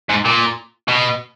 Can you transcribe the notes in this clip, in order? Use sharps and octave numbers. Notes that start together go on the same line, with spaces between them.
G#2
A#2
B2